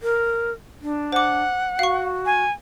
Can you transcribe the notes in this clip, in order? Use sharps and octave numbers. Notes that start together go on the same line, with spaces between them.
A#4
D4
C5 F#5 D6
F#4 F5 C#6
G#5